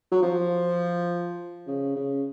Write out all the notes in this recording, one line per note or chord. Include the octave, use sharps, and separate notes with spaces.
F#3
F3
C#3
C#3